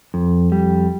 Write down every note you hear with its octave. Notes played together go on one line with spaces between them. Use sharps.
F2
G3